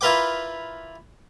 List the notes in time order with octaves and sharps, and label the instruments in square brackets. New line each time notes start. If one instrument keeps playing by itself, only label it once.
[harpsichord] E4 F4 A#4 B4 G5 D6